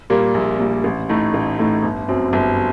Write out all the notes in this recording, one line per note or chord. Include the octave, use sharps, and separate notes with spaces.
A#2 G3 A#3
A#1
A#2 G3 A#3
A1
A2 A3 D#4
A1
A2 A3 D#4
G1
F#2 F#3 C4
G1